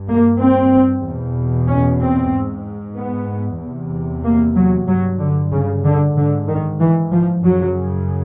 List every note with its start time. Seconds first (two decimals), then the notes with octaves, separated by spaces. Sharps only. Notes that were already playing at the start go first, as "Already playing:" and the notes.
Already playing: G2
0.08 A#3
0.40 C4
1.04 E2 B2
1.68 C#4
2.00 C4
2.32 G#2
2.96 B3
3.60 E2 C3
4.24 A#3
4.56 F#3
4.88 G2 F#3
5.20 D3
5.52 C#3
5.84 D3
6.16 G#2 D3
6.48 D#3
6.79 E3
7.12 F3
7.43 F#2 C#3 F#3